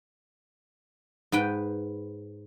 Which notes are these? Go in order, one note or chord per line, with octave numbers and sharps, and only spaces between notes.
G#2 B4 G5